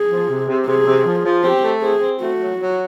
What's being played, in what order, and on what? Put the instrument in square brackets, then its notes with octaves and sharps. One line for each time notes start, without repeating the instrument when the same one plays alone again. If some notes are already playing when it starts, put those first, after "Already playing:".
Already playing: [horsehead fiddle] G#4
[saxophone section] F3
C3
C3
[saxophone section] C3 [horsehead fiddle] G#4
[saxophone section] C3
F3
F3
[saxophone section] C4 [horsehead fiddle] G4
[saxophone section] A3
[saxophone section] C4 [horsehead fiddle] G#4
[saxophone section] C4
[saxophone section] A3 [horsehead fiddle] F#4
[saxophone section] F#3
F#3